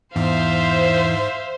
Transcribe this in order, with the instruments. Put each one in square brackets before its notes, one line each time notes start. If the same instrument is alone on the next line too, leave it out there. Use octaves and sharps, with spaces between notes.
[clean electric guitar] E2 [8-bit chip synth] G#2 [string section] C5 [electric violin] E5 F5